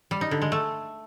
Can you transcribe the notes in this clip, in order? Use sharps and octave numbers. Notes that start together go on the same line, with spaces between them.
G3
D#4
D3
G#3
A3